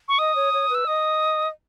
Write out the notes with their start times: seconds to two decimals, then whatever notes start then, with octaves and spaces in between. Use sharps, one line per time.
0.08 C#6
0.19 D#5 D#6
0.36 C#5
0.53 C#5
0.70 B4 E6
0.87 D#5 D#6